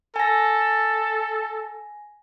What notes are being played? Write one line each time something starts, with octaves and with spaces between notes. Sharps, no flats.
A4 G#5 A#6